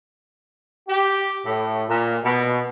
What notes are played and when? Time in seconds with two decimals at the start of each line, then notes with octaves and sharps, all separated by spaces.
0.88 G4
1.46 A2
1.89 A#2
2.24 B2